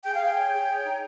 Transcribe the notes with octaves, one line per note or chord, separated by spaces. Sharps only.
G#4 G5
F5
G#4
G5
C#5
G#4
C#5
D#4